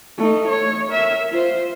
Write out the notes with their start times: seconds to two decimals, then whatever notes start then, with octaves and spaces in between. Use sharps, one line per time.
0.18 A3 D#4
0.48 C#5
0.88 A#4 E5
1.31 F4 C5